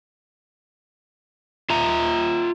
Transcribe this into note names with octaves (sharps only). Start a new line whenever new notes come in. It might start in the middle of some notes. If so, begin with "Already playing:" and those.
F4 E5 A#5